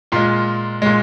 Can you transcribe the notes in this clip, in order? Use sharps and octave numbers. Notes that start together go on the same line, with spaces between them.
A#2 G#3 F4
A#2 G#3